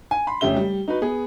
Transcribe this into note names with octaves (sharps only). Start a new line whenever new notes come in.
G#5
B5 C6
F1 C#3 G4 E5 G7
G3
D#4 F#4 B4
B3 G#4